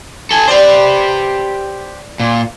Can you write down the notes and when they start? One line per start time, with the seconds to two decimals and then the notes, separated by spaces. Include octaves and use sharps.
0.31 A4 G#5
0.48 G4 B4 C5 D5
2.20 A#2